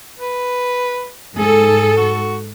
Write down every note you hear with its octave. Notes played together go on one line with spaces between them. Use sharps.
B4
G#2 G#4 A4
F#4